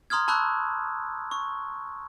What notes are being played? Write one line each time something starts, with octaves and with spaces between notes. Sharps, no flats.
A#5 C6 D#6 F6 G#6
A5 B5 C#6 E6 F#6
C#6